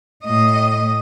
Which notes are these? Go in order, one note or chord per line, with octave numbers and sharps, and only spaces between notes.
A2 D#5